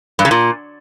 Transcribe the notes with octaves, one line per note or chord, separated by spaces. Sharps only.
G2
C#3
A#2